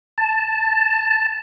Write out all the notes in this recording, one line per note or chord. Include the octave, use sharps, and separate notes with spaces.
A5